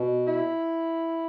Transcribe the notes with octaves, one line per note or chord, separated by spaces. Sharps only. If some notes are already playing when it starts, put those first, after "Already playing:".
Already playing: B2
E4